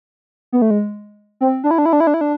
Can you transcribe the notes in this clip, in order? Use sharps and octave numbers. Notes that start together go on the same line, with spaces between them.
B3
A3
G#3
C4
D4
E4
D4
E4
D4
E4
D4
E4
D4